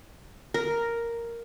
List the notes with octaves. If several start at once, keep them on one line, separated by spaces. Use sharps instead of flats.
A#4